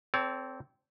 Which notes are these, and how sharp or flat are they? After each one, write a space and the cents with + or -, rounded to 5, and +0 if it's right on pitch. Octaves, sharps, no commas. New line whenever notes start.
C4 -5 A4 +0 C#5 +45